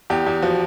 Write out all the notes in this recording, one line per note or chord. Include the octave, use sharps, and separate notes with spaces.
E2 G4
E2
F3 F#4